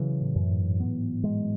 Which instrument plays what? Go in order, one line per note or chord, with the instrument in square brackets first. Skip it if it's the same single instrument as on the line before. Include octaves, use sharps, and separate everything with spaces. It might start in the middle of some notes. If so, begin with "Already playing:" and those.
Already playing: [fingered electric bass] C#3 [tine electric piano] E3 F#3
[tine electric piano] A2
[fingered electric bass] F#2
[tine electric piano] G#2
[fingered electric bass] B3
G#3